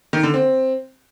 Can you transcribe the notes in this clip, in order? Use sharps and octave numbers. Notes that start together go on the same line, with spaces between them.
D#3
D3
C4